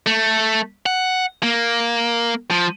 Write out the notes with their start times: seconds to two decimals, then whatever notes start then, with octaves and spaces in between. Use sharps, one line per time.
0.07 A3
0.86 F#5
1.43 A#3
2.51 F3